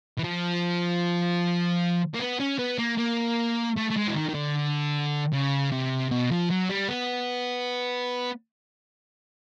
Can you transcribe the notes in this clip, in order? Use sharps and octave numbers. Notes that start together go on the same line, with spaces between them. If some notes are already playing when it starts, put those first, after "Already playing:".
E3
F3
A#3
B3
C#4
B3
A#3
A#3
A3
A3
G#3
E3
D#3
D#3
D3
C#3
C3
B2
F3
F#3
G3
B3